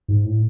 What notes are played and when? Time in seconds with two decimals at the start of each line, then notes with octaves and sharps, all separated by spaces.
0.08 G#2
0.25 A2